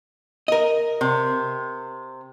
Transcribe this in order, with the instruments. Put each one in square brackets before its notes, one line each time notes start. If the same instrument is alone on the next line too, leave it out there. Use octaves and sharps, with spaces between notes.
[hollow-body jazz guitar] A#4 D#5
[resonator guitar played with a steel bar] C3